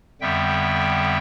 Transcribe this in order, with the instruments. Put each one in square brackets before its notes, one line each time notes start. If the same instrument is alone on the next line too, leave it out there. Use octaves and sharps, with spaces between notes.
[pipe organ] F2 D3 G3 B3 E5 G5